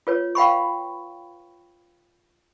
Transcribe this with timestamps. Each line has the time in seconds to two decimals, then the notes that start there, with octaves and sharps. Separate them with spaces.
0.07 F4 B4 C#5
0.35 F5 G5 B5 C#6